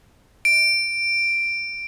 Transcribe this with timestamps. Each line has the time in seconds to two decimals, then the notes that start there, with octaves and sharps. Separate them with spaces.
0.45 D7